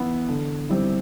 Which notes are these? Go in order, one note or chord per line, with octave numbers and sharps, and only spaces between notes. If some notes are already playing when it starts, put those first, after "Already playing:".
Already playing: E3 B3 E4
D3
G3 C4 E4